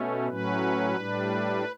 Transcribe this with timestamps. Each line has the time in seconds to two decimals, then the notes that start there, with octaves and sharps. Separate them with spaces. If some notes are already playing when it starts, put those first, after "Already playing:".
Already playing: B2 A3 C#4
0.28 A2 F#3 C#4 B4
0.96 A2 G3 D4